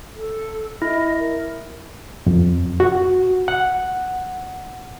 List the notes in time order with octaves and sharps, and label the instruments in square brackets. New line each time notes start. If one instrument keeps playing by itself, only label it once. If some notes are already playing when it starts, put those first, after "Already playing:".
[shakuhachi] A4
[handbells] E4 [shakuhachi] D#5
[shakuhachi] A#4
[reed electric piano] F2
F#4
F#5